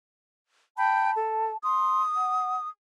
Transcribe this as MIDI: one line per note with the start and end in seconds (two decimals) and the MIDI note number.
0.78 1.12 79
0.78 1.57 81
0.78 1.12 83
0.78 1.12 91
1.16 1.51 69
1.64 2.03 84
1.64 2.68 87
2.16 2.56 78